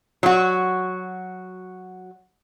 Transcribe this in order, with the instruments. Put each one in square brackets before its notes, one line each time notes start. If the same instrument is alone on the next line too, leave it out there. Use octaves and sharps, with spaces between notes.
[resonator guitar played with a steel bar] F#3 F#4